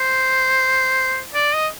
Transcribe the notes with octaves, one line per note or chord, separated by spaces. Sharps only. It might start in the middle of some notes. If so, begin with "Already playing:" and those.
Already playing: C5
D5
D#5